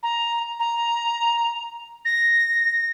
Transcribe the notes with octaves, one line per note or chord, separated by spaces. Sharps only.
A#5
A#5
A#6